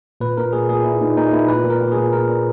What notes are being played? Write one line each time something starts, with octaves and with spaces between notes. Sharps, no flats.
A#2 B4
A#2 A#4
A#2 G#4
A#2 G#4
A#2 E4
A#2 D#4
A#2 D#4
A#2 E4
A#2 B4
A#2
A#4
A#2
G#4
A#2
A#2 A#4
A#2